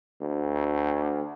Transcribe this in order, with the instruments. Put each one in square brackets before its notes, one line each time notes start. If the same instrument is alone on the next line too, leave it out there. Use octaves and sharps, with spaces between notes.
[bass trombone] D2